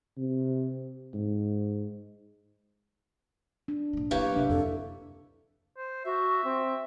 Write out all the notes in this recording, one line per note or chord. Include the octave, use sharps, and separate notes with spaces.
C3
G#2
D4
A#1 F#3
F#3 A#3 B3 E4 G4 B4 C#5
G2 C3 D4 E5
F2 D3 A4
C5
F#4 E5
C4